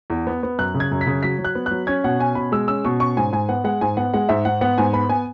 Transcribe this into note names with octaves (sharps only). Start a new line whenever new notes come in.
E2
B3
B3
F#2 F#6
C#3
G#6
F#2
B6
C#3
F#3 B6
F#3
F#6
B3
F#3 F#6
C#4 G#6
B2 F#5
C#4 G#5
B2 B5
G#3 E6
C#4 E6
B2 C#6
C#4 C#6
G#2 G#5
G#2 G#5
B3 F#5
G#3 F#5
G#2 G#5
B3 F#5
G#3 F#5
G#2 E5
G#2 F#5
B3 F#5
G#2 G#5
B3 B5
B3 G#5